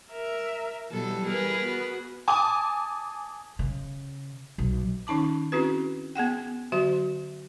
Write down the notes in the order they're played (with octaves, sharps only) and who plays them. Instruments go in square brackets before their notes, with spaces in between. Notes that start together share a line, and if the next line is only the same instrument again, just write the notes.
[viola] A#4 E5
[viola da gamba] B2 F#3 A4 [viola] E3 G3
[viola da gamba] G#4 A#4 B4
[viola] B3 F#4
[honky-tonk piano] G#5 A5 D6 D#6
[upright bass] C#3
B1
[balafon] D#3 C#4 D#4 A5 D6
C4 C#4 E4 F#4 G#4 B4
B3 G#4 F#5 G5
D3 F#3 F#4 E5